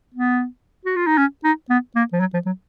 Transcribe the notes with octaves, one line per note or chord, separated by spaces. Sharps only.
B3
F#4
F4
D#4
C#4
D#4
B3
A#3
F3
F#3
F3
F#3